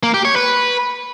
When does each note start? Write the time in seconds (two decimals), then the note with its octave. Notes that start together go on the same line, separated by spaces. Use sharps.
0.03 A#3
0.14 G4
0.25 C#5
0.36 B4